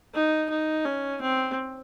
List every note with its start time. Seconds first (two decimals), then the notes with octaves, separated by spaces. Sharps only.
0.14 D#4
0.50 D#4
0.85 C#4
1.21 C4